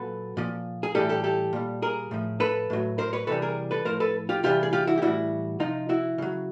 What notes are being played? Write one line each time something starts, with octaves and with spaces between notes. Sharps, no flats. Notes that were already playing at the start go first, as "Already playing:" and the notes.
Already playing: A#2 F#3 A4 B4
A#2 F3
G#4
A2 E3 G3 G4 A4
G4 A4
G4 A4
A#2 G3
G#4 A#4
A2 F3
A4 B4
A2 F#3
A#4 C5
B4 C#5
C3 E3 G3 A4 B4
G#4 A#4
A4 B4
A2 F3 A#4 C5
A4 B4
F4 G4
C3 E3 G3 F4 G4
G#4
F4 G4
E4 F#4
G4
A2 E3 G3 E4 F#4
C3 F3 D#4 F4
E4 F#4
C#3 F#3